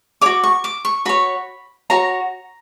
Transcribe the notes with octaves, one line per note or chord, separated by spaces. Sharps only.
F#4 C#5 D6
C#6
D6
C#6
F#4 C#5 B5
F#4 C#5 A#5